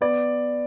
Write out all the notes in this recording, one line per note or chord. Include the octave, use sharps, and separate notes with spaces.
B3 D5